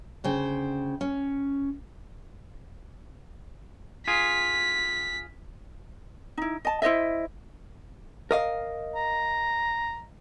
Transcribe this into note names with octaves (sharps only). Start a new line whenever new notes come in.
D2 C#3 C5 G5
C#4
F4 G#4 B6
D#4 E4
D#5 A5
E4 C5 D#5 E5
A#4 D#5 F5
A#5